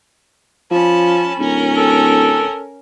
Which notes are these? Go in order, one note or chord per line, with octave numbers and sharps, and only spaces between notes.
F3 C#4 A5 B5
D1 C#4 A#4
A4